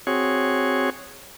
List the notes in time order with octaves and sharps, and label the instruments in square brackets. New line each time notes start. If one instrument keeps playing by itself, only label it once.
[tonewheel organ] C4 F#4 G#4 C#5